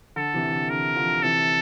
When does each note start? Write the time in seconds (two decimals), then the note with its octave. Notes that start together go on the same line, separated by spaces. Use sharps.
0.16 D3 A4
0.34 C3 E3
0.51 D3
0.70 D3 A#4
0.96 D3 F3
1.23 C3 E3 A4